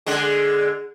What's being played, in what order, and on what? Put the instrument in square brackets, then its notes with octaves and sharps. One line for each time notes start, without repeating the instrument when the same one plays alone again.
[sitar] D3 G#3